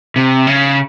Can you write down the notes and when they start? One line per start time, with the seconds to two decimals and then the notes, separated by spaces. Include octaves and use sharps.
0.16 C3
0.47 C#3